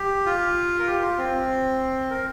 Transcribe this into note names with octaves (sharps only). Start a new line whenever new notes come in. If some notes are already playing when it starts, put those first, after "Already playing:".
Already playing: G4
F4
A#4
G4
F4
C4
A#4